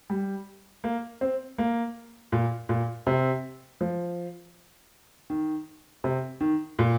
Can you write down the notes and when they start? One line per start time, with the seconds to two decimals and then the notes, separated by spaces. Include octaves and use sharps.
0.10 G3
0.84 A#3
1.21 C4
1.58 A#3
2.32 A#2
2.69 A#2
3.07 C3
3.81 F3
5.30 D#3
6.04 C3
6.41 D#3
6.79 A#2